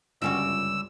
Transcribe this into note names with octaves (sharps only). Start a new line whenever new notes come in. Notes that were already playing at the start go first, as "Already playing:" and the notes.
G1 C#2 F#2 G3 C#4 F#4 E6